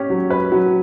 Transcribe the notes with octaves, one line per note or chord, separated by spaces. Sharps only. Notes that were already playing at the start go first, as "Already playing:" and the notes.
Already playing: C#4 G4
F#3
B4
F#3